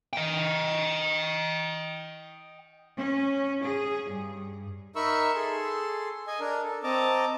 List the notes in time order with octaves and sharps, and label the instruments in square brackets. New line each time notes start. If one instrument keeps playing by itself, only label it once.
[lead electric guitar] D#5 G5
[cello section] C#4
G#4
G2
[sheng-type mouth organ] D#4 A#4 E5 B5 C#6 E6
G#4 A4 C6
D#5 G#5
D4 A#4
A4
C4 D#5 A5 A#5 D6